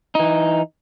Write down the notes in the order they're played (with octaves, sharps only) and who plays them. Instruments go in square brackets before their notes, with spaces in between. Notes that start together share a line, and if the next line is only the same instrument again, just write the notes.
[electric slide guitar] E3 D#4